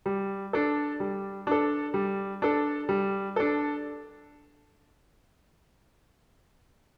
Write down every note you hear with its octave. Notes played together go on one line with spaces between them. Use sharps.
G3
D4 A4
G3
D4 A4
G3
D4 A4
G3
D4 A4